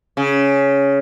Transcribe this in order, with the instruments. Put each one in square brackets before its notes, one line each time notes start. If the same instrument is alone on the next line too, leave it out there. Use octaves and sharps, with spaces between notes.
[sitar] C#3